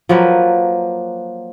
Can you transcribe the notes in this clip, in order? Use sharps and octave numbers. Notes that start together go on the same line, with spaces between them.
F3 F#3 A#3 B4